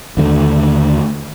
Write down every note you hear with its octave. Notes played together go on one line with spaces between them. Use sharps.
D#2 D3 G#3 A3